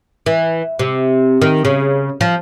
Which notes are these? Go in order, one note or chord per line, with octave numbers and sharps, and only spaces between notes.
E3
C3
D#3
C#3
F3